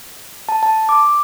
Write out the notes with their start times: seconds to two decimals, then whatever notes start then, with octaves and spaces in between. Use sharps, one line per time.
0.49 A5
0.63 A5
0.89 D6